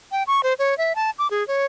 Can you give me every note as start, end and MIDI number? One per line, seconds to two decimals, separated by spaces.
0.12 0.23 79
0.27 0.41 85
0.43 0.54 72
0.59 0.77 73
0.78 0.95 76
0.95 1.10 81
1.19 1.28 86
1.31 1.46 68
1.48 1.66 73